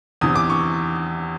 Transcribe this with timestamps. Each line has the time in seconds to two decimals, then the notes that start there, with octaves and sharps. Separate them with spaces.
0.21 E2 C3 E3 D#6
0.36 D6
0.50 C#6